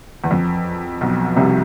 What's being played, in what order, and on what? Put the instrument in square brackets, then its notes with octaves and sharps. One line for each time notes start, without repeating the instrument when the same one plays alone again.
[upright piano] E2
F2
B1 B2
C2 C3